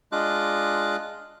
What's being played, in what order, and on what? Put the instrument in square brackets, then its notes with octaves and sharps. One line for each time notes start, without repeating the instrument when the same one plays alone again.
[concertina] G#3 D4 F4 D#5 D6 F#6